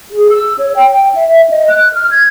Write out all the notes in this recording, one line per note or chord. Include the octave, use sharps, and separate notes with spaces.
G#4
E6
C#5
G5
G5
E5
D#5
F#6
F6
G#6